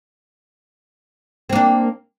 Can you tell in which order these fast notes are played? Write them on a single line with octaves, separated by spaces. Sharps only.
C4 A#3 D4